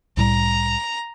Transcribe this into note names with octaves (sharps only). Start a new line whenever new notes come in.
C2 A2 G3 A#5